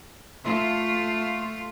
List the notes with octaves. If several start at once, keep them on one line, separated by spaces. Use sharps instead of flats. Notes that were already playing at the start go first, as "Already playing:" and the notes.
A3 F4